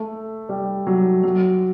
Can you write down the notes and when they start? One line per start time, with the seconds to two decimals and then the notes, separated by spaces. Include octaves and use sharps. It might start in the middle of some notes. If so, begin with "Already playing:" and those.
Already playing: A3
0.49 G3
0.87 F#3
1.23 F#3